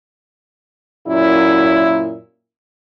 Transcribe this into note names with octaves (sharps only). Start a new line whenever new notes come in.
F#2 A#2 E4